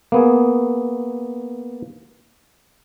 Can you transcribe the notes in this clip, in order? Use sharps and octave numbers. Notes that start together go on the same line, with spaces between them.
A#3 B3 G#4